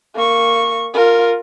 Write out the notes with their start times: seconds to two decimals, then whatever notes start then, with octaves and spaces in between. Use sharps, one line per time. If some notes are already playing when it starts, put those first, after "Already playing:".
0.15 A#3 C#6
0.94 F4 A#4